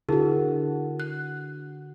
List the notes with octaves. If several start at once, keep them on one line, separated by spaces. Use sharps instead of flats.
D3 E4 F#4 G#4 A#4
F#6